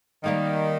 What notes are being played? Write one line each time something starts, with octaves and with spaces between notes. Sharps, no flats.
D#3 G3 A#3 D#4